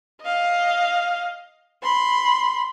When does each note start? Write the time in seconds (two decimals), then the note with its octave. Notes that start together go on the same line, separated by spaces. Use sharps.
0.22 D#5 F5
1.83 B5 C6